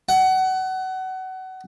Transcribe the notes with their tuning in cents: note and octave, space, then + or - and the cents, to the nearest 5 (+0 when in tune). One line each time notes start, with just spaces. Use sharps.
F#5 +25